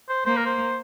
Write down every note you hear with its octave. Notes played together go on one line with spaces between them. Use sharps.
C5
A#3 C5
A#4
C5